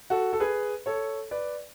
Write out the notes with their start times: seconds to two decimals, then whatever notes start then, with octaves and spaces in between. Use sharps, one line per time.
0.10 F#4 A4
0.33 A4
0.40 G#4 B4
0.86 A4 C#5
1.31 B4 D5